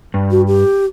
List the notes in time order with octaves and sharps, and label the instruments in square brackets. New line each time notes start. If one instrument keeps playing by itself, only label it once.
[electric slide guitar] G2
[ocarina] F#4
G4